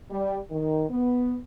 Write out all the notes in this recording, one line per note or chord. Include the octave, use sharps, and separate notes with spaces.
G3
D#3
B3